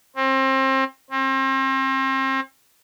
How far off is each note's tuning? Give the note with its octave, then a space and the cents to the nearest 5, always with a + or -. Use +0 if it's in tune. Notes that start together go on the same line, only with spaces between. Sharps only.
C4 +30
C4 +35